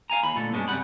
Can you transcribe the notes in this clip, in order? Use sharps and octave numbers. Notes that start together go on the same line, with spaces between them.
F5 G#5 A#5
D#2 B5
A#2 D3 A3 A4
G2 B2 G#3 B3 C#4 D4
F#2 C3 D#3 G3 F#5 B5